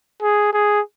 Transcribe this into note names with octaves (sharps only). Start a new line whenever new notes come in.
G#4
G#4